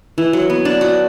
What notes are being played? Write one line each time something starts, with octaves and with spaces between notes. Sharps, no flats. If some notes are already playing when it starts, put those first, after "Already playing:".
E3
F#3
B3
D4
F#4